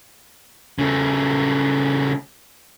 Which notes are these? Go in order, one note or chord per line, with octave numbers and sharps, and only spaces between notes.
C#3 A3